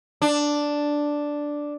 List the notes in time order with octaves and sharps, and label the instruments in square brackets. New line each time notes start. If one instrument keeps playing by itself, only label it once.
[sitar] D4